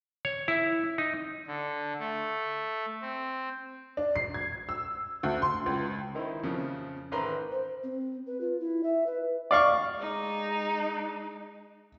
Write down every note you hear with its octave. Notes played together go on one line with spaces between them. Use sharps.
C#5
E4
D#4
D3
A3
C4
D4
C7
G#6
E6
D2
C6
C#2
D#3 D#4 E4 C5
F2 C#3 F3
A1 D#3 B4 C5 A#5 C6
C5
C4
B4
F4
E4
E5
B4
D5 F5 C#6
G#3 D#4